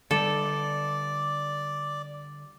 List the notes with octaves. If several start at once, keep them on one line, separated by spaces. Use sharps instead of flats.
D3 G3 A4 D5